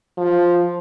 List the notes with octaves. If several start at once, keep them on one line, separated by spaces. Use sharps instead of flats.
F3